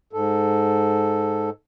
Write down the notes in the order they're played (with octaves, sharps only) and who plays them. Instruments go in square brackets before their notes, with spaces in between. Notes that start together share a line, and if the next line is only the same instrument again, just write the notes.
[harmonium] G#2 A4